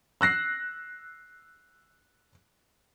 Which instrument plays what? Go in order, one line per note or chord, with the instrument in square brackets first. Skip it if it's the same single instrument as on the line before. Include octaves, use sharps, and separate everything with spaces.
[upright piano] E6 F#6 A#6 C7